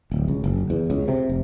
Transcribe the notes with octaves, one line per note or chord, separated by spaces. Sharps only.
D1
C#2
F#1
E2
C#2
C3
F1